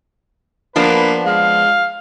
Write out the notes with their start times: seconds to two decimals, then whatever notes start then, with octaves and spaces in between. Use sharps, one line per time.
0.76 F3 A#3 B3 D4 B4
1.25 G#3 F5